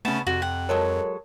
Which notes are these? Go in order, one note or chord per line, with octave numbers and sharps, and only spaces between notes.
C#3 A3 B3 C#4 A5
F2 C3 F#4
F#5 G5
F#3 G#3 A4 A#4 C#5